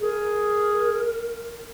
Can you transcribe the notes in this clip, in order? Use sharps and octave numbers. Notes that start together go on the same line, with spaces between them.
G#4 A#4